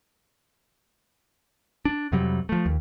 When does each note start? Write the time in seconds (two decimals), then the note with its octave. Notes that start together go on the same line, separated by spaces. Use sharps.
1.85 D4
2.12 F2 C3 F#3 G3
2.49 F3 A3
2.66 D#2